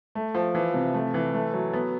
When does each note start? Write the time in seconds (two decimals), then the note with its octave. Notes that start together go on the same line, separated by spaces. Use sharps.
0.15 A3
0.35 F3
0.55 E3
0.74 C3
0.94 A3
1.14 E3
1.34 A3
1.53 F#3
1.73 B3